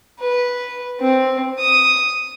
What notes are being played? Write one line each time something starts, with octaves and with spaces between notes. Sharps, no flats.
B4
C4
D#6